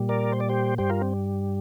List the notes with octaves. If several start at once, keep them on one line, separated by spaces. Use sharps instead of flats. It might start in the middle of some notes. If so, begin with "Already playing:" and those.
Already playing: A#2 G3
A#4 D5
C5
D5
G4 C5
G2 G3 G4 C5
F4 A#4
C4